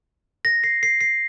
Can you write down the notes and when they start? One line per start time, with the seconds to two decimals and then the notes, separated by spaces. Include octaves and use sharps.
0.45 A#6
0.64 C7
0.83 C7
1.01 C7